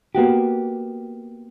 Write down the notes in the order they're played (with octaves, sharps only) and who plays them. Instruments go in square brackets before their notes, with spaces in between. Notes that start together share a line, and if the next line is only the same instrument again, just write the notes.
[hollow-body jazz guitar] A#3 B3 F#4 G4